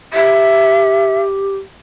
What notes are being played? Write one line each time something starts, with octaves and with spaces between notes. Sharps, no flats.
G4 E5